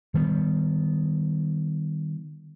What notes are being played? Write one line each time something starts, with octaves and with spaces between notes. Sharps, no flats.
D#3 G3 A#3 B3